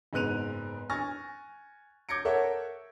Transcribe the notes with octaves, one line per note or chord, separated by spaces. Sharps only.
F#1 G#2 B3 F#6 D#7 F7
G#5 C#6 F6 A6 A#6
D6 G6 G#6 A#6 C#7 D7
A4 A#4 C#5 E5 F#5